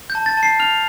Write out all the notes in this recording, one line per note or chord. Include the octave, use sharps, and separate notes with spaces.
G6
A5
A6
A5
C7
F6 F7